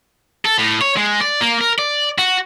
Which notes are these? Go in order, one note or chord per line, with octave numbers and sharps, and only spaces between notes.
A4
A2
C#5
G#3
D5
A#3
A#4
D5
F#4